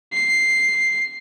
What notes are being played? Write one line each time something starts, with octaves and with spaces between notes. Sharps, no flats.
C7